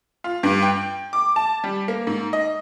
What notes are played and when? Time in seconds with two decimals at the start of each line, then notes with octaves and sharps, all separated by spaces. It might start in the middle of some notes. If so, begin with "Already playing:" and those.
0.24 F4
0.43 G2
0.62 G5
1.13 D6
1.36 A5
1.64 G3
1.88 A#3
2.07 G#2
2.33 D#5